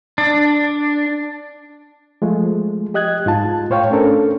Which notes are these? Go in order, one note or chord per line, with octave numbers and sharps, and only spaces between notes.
D4
F3 G#3 A3
G4 D#5 F#6 G#6
G#2 F4 A5
A2 C5 C#5 F5 G5 C#6
A3 C#4 D4 A4 A#4